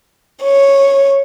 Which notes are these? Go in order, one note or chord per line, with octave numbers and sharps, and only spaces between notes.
C#5